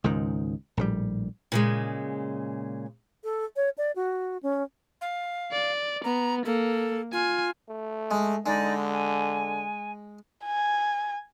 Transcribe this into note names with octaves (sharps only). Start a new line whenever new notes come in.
C#2 G#2 D#3
A#1 A2 E3 G3
A#2 C#3 G#3
A4
C#5
D5
F#4
C#4
F5
D5
B3 A#5
A#3 A4
F4 G#5
A3
G#3
D3 G#3 D#4 D5
G#5
G#5